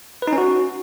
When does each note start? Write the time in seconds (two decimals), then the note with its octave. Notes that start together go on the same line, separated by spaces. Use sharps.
0.22 B4
0.27 D#4
0.33 C#4
0.38 F#4